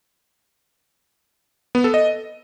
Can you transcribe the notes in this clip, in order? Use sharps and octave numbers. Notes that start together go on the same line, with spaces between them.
B3
A4
D#5